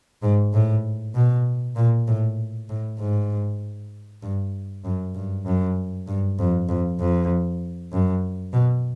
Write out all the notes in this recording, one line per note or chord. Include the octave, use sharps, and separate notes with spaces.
G#2
A2
B2
A#2
A2
A2
G#2
G2
F#2
G2
F#2
G2
F2
F2
F2
F#2
B2